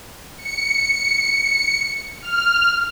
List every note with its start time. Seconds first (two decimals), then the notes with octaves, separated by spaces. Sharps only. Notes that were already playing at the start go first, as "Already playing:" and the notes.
0.37 C#7
2.20 F6